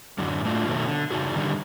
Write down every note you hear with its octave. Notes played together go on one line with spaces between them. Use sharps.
F#2 D3 F#3
A2 A3 D4 F4
B2 D#3 F#3 A3
D3
C#3 D4 D#4 F#4 G#4
G2 D3 D#3 G3